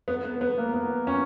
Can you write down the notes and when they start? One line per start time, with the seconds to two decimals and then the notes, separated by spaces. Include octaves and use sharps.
0.08 B3
0.24 B3
0.41 B3
0.58 A#3
0.74 B3
1.07 C#4